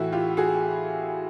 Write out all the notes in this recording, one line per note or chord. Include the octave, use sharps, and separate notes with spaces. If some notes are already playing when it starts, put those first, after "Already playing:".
Already playing: A2 E3 E4 F#4
F4 G4
F#4 G#4